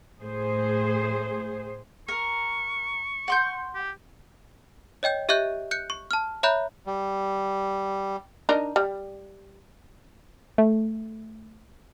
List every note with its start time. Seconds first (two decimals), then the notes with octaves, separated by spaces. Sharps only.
0.20 A2 G#4 C5
2.08 A#4 C#6
3.28 F#5 C6 G6
3.74 G4
5.03 C#5 D#5 G5 G6
5.29 G4 D#5 E5 C#6 F#6 G6
5.71 F#6 G6 C#7
5.90 C#6
6.11 A5 F6
6.43 C#5 E5 A#5 B5 F#6 G6
6.86 G3
8.49 D4 D#4 A#4
8.76 G3
10.58 A3